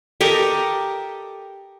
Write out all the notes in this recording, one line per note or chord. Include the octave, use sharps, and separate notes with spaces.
G4 A4 A#4 D#5